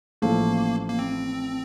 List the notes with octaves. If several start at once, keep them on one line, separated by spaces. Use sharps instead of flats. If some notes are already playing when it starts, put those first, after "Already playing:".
A1 A2 F3 A3 A#3
A#3
C4